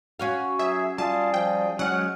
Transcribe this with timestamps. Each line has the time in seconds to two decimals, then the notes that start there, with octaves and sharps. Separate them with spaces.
0.20 C#4 F#4 F5
0.59 F#3 G#4 E5
0.98 G3 F4 G#4 A5
1.34 F3 G5
1.79 F#3 G#3 C#4 F#5 F6